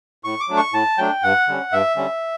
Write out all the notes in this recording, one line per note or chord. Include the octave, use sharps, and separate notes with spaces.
A2 C#6
D6
F#3 A3 D4
C#6
A2 A5
F#3 A3 D4 G5
G2 F#5
D3 G3 C#4
G2 E5
D3 G3 C#4